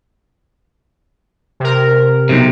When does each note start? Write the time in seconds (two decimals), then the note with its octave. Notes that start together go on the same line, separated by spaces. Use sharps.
1.60 C3 A#4
2.29 B1 C3